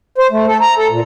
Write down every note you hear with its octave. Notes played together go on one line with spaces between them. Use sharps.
C5
A3
A4
A#5
A4
A#2